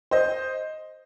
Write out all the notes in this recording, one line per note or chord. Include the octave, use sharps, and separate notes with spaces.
C5 D#5